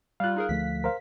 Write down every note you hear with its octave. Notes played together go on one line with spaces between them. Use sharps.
G3 F4 F5 F#6
D#4 G#4 A#4
D2 F3 A3 B6
A#4 C5 F5